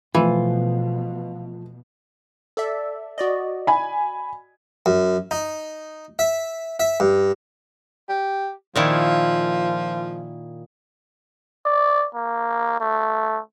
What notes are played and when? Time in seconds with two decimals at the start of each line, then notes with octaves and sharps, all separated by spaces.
0.15 B2 E3 F3 A3 F4
2.57 A4 D5 E5
3.18 F#4 D5 D#5
3.67 G#5 B5
4.86 F#2
5.31 D#4
6.19 E5
6.80 E5
7.00 G2
8.09 G4
8.76 A#2 D#3 F3 E4
11.65 D5
12.15 A#3
12.80 A3